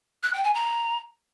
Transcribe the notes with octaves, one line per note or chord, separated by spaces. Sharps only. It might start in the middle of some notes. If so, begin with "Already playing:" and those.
F#6
G5
G#5
A#5